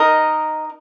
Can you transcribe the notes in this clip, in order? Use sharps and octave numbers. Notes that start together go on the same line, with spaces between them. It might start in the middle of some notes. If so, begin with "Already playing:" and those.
Already playing: D#4 A#4 D#5